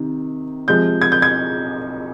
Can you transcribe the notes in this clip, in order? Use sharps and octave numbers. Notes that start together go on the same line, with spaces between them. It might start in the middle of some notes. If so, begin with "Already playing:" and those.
Already playing: C3 D#3
C3 F3 G#3 G6
G#6
G6
G#6